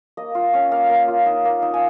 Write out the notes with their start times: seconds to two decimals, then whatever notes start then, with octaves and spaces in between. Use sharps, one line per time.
0.17 A#3 D#5
0.35 F4
0.53 C#4
0.71 A#3 F5
0.89 A#3
1.08 F4
1.26 D#4
1.45 A#3
1.62 D#4
1.74 G#5